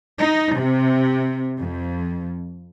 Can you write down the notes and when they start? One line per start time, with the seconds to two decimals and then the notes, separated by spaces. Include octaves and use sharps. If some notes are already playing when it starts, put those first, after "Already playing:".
0.19 D#4
0.55 C3
1.60 F2